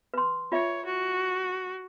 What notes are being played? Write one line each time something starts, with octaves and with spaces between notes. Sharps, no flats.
B4 C6
F4 C#5 E5
F#4